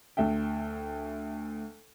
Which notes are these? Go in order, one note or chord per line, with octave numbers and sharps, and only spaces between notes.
D2 E5 G5